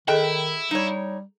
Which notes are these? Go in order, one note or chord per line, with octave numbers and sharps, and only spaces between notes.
D#3 E4 G#4 A4 D#5 G5
G3 D#4 C#5